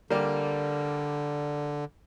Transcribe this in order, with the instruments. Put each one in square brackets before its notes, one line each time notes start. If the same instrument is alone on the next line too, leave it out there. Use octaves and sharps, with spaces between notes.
[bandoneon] D3 [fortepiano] G3 A#3